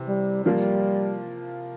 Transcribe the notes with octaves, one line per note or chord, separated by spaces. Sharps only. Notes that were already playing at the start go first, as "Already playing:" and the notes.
Already playing: C3 E3
G3
F3 G3 A#3 F4